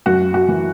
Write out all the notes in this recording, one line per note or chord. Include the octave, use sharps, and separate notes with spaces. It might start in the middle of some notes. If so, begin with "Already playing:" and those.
F#2 F#4
F#4
E3